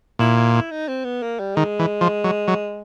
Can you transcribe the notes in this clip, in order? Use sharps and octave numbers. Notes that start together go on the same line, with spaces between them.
A#2 E4
E4
E4
D#4
C4
B3
A#3
G3
D#3 G#3
E3
F3
F#3
F#3